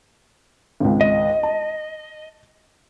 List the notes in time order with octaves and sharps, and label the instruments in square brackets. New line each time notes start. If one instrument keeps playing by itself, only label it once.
[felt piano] G#1 C#2
[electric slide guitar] D#5
[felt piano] A5